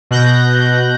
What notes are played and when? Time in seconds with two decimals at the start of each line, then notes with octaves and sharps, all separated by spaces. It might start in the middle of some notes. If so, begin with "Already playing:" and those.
0.11 B2 F#6 G6 A#6